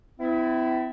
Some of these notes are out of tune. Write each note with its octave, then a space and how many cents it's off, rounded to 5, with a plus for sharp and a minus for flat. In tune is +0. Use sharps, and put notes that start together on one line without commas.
C4 -45 E4 +0